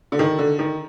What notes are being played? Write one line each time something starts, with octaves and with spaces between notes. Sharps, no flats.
D3
D#3
D3
D#3